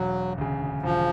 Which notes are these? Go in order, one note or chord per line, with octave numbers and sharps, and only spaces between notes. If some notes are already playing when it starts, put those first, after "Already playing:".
Already playing: E1 F#3
D2 C#3
E1 F3